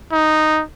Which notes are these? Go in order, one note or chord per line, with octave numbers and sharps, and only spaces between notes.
D#4